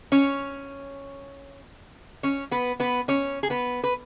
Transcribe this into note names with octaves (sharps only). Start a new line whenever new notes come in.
C#4 C#5
C#4 C#5
B3 B4
B3 B4
C#4 C#5
G#4
B3 B4
B4